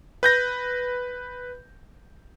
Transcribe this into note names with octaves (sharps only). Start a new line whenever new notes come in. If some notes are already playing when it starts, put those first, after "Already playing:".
B4 G6 A#6